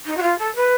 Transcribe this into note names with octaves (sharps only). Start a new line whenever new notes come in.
D#4
F#4
F4
A4
B4